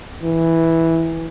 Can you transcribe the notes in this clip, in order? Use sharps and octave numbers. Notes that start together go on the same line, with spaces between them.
E3